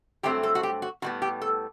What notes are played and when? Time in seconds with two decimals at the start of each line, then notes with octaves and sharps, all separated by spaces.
0.23 G2 F#3 A3 C4 G4
0.43 A4
0.55 F#4
0.63 G4
0.82 F#4
1.02 A2 G3 B3 F#4
1.22 G4
1.42 A4